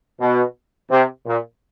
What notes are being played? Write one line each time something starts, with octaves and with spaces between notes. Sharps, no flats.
B2
C3
A#2